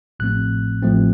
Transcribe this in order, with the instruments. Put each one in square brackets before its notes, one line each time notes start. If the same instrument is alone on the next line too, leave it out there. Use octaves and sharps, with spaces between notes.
[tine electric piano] A1 A2 F3 A3 C4 F#6
A1 A2 F3 A3 C4